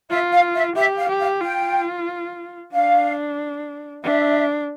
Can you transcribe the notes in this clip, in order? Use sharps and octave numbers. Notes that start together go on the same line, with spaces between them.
F4 E5
F5
E5
G4 E5
F5
G4
F5
F4 G5
D4 F5
D4 E5